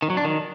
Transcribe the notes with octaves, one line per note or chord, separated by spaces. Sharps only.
D#3
F#3
D4
D#3